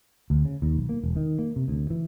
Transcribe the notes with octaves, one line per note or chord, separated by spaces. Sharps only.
D2
C#3
D#2
B1
A#3
E1
D#3
A#3
C3
D2
E3